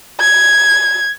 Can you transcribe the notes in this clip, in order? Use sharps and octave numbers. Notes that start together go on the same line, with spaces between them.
G#6